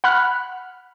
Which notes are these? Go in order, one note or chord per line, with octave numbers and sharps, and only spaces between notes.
F#5 B5 F6 F#6